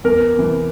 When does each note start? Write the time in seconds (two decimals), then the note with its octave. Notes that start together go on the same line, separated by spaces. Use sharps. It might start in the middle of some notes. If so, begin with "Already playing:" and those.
0.04 E2 A#4
0.34 C3 E3